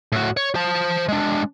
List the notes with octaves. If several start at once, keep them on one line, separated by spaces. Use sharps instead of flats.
A2 F#4
C#5
C5 A5
G#3 D4